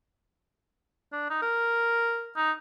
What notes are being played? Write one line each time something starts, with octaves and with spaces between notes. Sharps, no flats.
D4
D#4
A#4
D#4